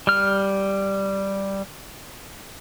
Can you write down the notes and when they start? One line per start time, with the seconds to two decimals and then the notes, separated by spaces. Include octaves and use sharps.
0.07 G3 F6